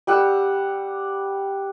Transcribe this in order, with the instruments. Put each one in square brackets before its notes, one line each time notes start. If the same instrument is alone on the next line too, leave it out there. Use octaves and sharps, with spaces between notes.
[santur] G3 F#5 E6